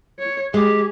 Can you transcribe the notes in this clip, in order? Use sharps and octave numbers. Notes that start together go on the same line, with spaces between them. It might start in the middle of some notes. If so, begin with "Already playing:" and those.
C#5
G#3 G4 G#4